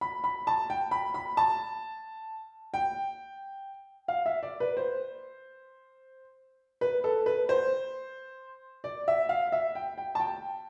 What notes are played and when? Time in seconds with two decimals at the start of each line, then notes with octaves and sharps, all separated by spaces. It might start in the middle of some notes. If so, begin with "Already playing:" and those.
0.01 B5
0.24 B5
0.47 A5
0.70 G5
0.91 B5
1.14 B5
1.37 A5
2.74 G5
4.08 F5
4.26 E5
4.43 D5
4.60 B4
4.77 C5
6.81 B4
7.04 A4
7.26 B4
7.49 C5
8.84 D5
9.08 E5
9.29 F5
9.52 E5
9.75 G5
9.98 G5
10.15 A5
10.20 G5